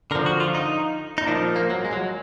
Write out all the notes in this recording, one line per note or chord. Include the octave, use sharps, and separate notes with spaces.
D3 F3 A#4
F#4
F4
D#4
D#4
A#2 F3 D4
A#3
F#3
G#3
F#3